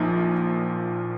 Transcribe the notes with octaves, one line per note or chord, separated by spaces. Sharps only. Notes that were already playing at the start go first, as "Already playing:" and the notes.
Already playing: A#1 A#2 F3 D#4